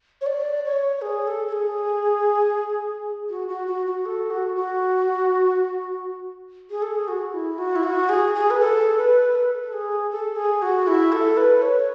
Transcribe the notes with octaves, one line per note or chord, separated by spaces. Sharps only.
C#5
D5
C#5
G#4
A4
A4
G#4
F#4
F#4
F#4
F#4
A4
F#4
F#4
G#4
A4
G#4
F#4
E4
F#4
E4
F#4
G#4
G#4
B4
A4
B4
A4
A4
G#4
A4
G#4
F#4
E4
A4
B4
C#5